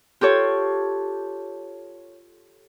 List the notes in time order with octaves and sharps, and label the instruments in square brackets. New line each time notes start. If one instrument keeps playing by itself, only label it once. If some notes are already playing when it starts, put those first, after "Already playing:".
[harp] F4 G4 A4 C#5